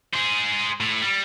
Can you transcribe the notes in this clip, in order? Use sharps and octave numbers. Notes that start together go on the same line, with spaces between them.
G#4 C5
A2
G3